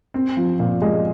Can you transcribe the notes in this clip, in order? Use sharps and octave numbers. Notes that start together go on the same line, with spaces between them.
C4
F3
A#2
G#3